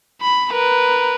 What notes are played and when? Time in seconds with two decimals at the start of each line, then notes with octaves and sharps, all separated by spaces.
0.21 B5
0.51 A#4 B4